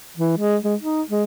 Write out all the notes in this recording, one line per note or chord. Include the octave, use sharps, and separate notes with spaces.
E3
G#3
G#3
D#4
G#3